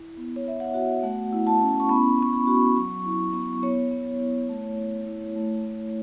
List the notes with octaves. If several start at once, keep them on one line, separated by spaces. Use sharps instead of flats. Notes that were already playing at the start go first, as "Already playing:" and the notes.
Already playing: E4
B3
C#5
B3 E5
F#5
F#4
A3 F#5
E4
A5
C#4
C#6
B3 B5
B3 C#6
B5
F#4
F#3 C#6
E4
B3 C#6
B3 C#5
B3
E4
A3
A3
E4
A3
A3